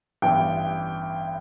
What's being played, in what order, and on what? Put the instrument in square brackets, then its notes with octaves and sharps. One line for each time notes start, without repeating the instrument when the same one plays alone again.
[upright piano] A1 G2 E3 B3 G5